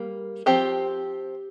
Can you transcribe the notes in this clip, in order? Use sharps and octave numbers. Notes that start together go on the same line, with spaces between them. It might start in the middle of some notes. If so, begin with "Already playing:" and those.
Already playing: G3 A#3
F3 C4 G4